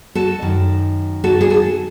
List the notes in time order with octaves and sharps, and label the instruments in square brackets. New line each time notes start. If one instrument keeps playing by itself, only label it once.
[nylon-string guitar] F#4 A4
F#2 D#3
F#4 A4
G#4
F#4 A4